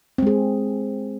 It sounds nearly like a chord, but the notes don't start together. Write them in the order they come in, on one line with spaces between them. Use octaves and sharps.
C4 G#3 G#4